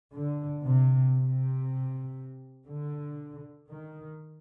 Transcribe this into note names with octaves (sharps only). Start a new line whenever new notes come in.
D3
C3
C3
D3
D#3